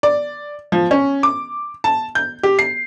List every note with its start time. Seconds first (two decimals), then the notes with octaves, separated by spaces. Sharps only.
0.03 D5
0.72 F3
0.91 C#4
1.23 D6
1.84 A5
2.15 G6
2.43 G4
2.59 C7